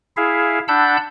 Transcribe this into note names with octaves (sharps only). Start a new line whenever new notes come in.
E4 G#4 E5 F5
D4 F#5 A5 B5 E6 G6